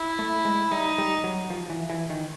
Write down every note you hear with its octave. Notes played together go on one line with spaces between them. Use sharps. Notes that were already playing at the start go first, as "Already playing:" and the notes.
Already playing: E4
A3
G#3
G3 D#4
G3
F#3
F3
E3
E3
D#3